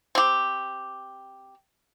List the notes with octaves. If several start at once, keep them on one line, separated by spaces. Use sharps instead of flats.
C4 G4